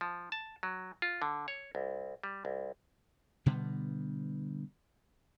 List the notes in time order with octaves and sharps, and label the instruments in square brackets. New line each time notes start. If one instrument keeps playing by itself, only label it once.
[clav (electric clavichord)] F3
A5
F#3
F4
D3
C#5
C2
G3
C2
[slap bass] B2 D3 G3 B3